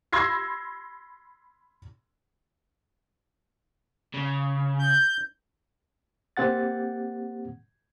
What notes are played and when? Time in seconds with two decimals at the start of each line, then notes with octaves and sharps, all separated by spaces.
0.13 B5 C6 E6 G#6 A#6 C7
4.14 C#3
4.79 G6
6.37 A#3 C4 G4 F#5 A6